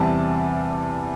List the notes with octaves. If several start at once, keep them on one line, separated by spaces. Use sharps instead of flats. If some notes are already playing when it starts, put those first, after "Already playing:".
Already playing: E2 C3 G3 A5